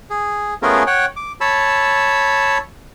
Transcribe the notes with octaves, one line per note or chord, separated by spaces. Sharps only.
G#4
A3 B3 C#4 F4 G#4 A#4
C#5 F#5 G5
D6
C#5 A5 B5 E6